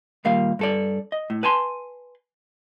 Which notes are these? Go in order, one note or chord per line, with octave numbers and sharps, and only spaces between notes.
D#2 A#2 G3 A#3 F5
G2 A4 D5
D#5
A2
B4 G#5 A5 C6